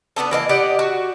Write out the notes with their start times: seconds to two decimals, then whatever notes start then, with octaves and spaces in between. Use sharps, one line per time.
0.16 B3 D4 D#4 A4
0.31 E3 A#3 D#5
0.49 G4 D5 D#5 F#5
0.79 F#4